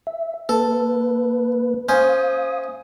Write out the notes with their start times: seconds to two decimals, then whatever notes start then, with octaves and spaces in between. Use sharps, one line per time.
0.07 E5
0.49 A#3 A4 B4
1.89 C#4 C5 F5 D#6